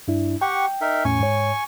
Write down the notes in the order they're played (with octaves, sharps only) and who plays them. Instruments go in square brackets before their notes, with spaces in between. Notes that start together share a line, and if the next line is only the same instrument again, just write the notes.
[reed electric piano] G2 D4 E4
[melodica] G4 F#5 C#6 [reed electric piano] G5
[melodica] D#4 A#4 E5
[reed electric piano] E2 A2 C#4 [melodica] G#5 C#6
[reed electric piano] G#2 C#5